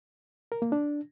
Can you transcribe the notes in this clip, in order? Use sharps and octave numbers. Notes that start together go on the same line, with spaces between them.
A#4
A#3
D4